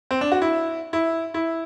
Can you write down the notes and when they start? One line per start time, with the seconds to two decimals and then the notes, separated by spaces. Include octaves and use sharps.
0.11 C4
0.21 D4
0.32 F#4
0.42 E4
0.93 E4
1.34 E4